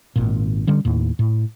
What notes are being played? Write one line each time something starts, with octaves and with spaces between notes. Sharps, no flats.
G#1 A#2
D3 G3 C#4
D#2 A2
A2